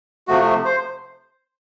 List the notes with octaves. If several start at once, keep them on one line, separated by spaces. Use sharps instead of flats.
C3 F3 A3 F#4
C5